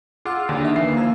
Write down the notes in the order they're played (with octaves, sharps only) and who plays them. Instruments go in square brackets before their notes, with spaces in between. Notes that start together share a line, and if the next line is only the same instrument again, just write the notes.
[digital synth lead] F4 [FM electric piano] G#4 F#5 E6 [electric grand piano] D6
[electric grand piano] D#2 [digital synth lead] D3
[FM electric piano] D4 D#4 E5
[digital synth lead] E3 [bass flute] A#3 [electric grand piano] C7
[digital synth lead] F3 [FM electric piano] A#5 E6 G#6